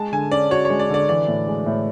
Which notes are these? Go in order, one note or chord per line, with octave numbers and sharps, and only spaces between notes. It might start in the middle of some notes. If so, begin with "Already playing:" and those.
Already playing: G#3 A5
D3 G#5
C#4 D5
F#4 C#5
C#5
G#3
D5
D3 D5
E3 D5
A2
G#3
A2